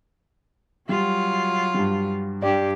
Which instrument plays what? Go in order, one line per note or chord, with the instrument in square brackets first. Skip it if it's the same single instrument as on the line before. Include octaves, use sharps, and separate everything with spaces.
[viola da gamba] F#3 F4 [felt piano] G3
[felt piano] G2 G3
[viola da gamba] G2 G4 [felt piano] D5